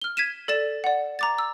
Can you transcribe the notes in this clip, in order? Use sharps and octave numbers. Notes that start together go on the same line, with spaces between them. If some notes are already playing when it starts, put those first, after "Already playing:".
F6 G7
G#6 B6 D#7 E7
A4 D5 A6 E7
D5 F#5
A#5 D6 A6
E6